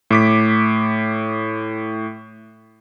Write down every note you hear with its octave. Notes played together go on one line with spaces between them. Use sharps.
A2 D6 B6